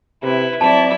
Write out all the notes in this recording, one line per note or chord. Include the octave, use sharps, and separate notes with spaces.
C3 E4 B4
F#3 C4 E4 D5 E5 A5